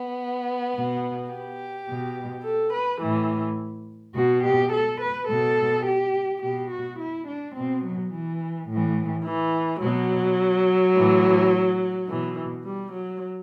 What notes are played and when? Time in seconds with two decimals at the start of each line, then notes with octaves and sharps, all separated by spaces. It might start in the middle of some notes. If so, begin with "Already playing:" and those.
Already playing: B3
0.75 B2
1.32 G4
1.88 B2
2.45 A4
2.74 B4
3.02 A2 E3
4.15 B2 F#4
4.44 G4
4.71 A4
5.00 B4
5.28 B2 A4
5.85 G4
6.42 B2 G4
6.70 F#4
6.98 E4
7.27 D4
7.55 B2 C4
7.83 F#3
8.12 E3
8.68 A2
8.73 E3
9.25 E3
9.81 B2 F#3
10.95 A2 E3
12.08 B2 E3
12.65 G3
12.93 F#3